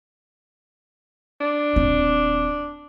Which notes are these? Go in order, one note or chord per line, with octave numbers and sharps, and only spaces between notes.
D4
D#1 C4